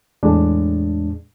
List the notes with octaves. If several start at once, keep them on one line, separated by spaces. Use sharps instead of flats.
E2 A2 G#3 D4